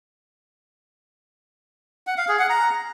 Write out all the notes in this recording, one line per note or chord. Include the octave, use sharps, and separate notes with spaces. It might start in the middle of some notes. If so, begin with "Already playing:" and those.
F#5
F5
G#4
F#5
A#5